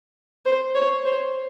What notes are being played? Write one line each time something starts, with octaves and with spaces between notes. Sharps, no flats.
C5
C#5
C5